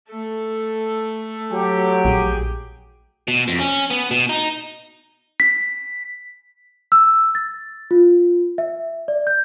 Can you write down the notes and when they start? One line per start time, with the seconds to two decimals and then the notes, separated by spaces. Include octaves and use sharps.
0.10 A3 A4
1.52 F#3 G4
2.05 A#1 G#4 G5
3.28 B2
3.48 F2
3.60 C#4
3.90 B3
4.11 B2
4.29 D#4
5.40 B6
6.92 E6
7.35 A6
7.91 F4
8.58 E5
9.08 D5
9.27 G6